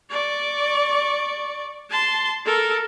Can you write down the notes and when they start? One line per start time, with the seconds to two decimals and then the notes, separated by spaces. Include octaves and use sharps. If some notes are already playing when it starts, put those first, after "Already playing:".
0.10 D5 C#6
1.91 A5 C6
2.45 A4 A#4